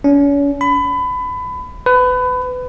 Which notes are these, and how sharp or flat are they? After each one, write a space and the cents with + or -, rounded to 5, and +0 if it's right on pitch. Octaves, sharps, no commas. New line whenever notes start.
C#4 +40
B5 +25
B4 +25